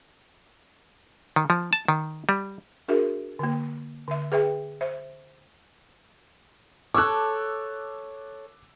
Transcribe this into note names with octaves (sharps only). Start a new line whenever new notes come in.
D#3
F3
A5
D#3
G3
D4 F#4 G#4 A#4 E5
D3 A#3
D3 E5
G#4 B4 E5 G5
C5 E5
A4 C#5 D6 E6 F#6